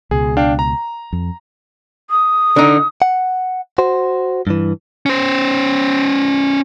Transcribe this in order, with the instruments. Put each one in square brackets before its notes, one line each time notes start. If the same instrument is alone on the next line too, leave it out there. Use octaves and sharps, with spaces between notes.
[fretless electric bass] C#2 B2 [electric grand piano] G#4
[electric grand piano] D4 F5 G5
A#5
[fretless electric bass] F2
[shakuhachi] D#6
[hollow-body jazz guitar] D3 D#4
[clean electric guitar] F#5
F#4 C5
G2 E3
[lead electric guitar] C#4 C5